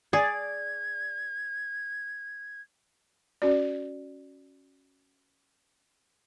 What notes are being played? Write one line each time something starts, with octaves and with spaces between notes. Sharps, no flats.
G#4 D5 G#6
C#4 F#4 D5